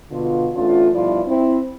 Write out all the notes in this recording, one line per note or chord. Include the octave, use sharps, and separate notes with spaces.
B2 D3 F4
E2 A3 C#4 D4 F4
G2 B2 F3 E4 F4 D5
C4 E4